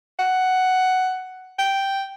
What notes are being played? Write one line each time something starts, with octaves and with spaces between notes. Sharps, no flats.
F#5
G5